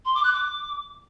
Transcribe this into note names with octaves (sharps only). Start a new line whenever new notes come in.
C6
D6
F#6
D6